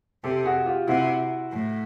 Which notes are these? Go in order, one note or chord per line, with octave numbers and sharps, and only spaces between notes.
C3 G4 A4
F#4 G#4
F4 G4
C3 E4 F#4
A2